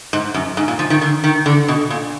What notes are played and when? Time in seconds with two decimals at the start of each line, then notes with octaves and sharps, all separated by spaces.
0.13 G#2
0.34 F#2
0.57 G#2
0.68 A#2
0.79 F3
0.90 D#3
1.01 D3
1.24 D#3
1.46 D3
1.68 B2
1.90 A#2